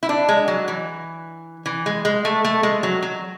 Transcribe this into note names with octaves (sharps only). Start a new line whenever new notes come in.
E4
D4
G#3
F#3
E3
E3
G#3
G#3
A3
A3
G#3
F#3
F#3